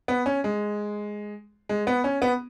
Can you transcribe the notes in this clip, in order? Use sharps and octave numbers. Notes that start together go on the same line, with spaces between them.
B3
C#4
G#3
G#3
B3
C#4
B3